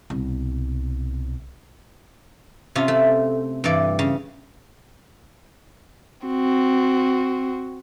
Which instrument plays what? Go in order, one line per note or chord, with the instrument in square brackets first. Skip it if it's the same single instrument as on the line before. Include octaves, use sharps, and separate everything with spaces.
[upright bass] C2 B2
[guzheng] C3 C#4 F4
A3
G2 E3 D5
C#3
[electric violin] C4 F#4